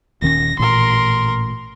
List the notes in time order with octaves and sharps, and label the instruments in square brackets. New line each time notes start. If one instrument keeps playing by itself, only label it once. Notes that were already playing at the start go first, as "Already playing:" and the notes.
[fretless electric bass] D#1 D#3 C#4 [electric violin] A#6
[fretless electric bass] A1 A#2 [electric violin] A#4 C6